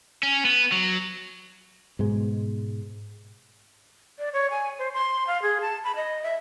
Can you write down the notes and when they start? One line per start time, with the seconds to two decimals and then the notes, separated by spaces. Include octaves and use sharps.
0.23 C#4
0.45 B3
0.72 F#3
1.99 G#2 B2 G#3
4.19 D5
4.33 C#5
4.51 G#5
4.79 C5
4.94 C6
5.27 F5
5.42 G#4
5.61 A5
5.84 B5
5.96 D#5
6.23 E5